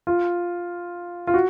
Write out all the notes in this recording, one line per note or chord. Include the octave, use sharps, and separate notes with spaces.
F4
F4
F#4